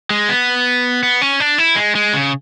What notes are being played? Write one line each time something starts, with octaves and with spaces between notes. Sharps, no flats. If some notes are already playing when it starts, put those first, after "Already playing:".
G#3
B3
B3
C#4
D4
E4
G#3
G#3
C#3